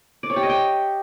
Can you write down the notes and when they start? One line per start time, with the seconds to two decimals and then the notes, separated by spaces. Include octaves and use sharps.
0.23 D5
0.30 C#5
0.36 G4
0.43 D#5
0.49 G5